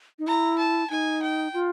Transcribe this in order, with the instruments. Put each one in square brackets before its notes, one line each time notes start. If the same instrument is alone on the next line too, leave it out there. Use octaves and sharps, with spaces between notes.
[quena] D#4
[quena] E4 [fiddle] A#5
[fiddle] A5
[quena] D#4 [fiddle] G#5
[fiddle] G5
[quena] F4